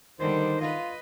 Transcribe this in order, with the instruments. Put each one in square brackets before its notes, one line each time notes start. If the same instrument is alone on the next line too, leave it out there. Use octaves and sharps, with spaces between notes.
[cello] D3 G3 [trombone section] D#3 [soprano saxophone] C5
[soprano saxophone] F4 [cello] B4 D#5